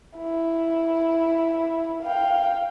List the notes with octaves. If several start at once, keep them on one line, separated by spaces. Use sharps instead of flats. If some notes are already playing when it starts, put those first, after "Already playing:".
E4
F5 G5